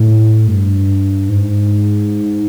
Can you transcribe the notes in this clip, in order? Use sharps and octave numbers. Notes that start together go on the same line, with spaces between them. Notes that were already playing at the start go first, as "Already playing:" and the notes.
Already playing: A2
G2
G#2